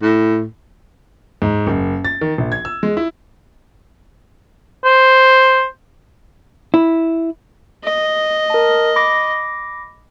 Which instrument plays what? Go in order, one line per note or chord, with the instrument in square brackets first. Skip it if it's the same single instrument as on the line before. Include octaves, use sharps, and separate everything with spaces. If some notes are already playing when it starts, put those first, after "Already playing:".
[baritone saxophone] A2
[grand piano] G#2
F#1
A6
D#3
A#1
G#6
E6
G#3
E4
[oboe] C5
[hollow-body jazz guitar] E4
[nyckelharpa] D#5
[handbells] A#4 A5
B5 D6 A#6